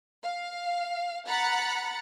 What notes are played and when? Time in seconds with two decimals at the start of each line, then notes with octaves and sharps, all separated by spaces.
0.22 F5
1.27 F#5 A#5 B5 F#6 A6 C#7